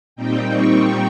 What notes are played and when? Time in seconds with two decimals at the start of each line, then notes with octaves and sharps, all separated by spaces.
0.16 A#2 G3 C4 D#4 G5
0.49 C#6